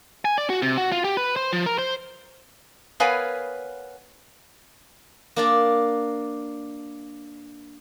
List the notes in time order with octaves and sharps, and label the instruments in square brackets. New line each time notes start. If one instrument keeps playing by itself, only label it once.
[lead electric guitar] G#5
D5
F#4
C3
F#4
F4
G4
B4
C5
F3
A#4
C5
[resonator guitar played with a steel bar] B3 A#4 B4 C#5 F5 G#5
[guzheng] A#3 D4 D5